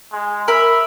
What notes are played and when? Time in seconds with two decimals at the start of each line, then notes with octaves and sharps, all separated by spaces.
0.12 G#3
0.48 A#4 E5 B5